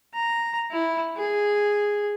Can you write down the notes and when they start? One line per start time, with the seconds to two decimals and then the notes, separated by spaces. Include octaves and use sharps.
0.14 A#5
0.71 E4
1.17 G#4